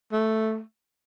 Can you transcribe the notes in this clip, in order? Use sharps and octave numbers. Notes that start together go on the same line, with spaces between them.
A3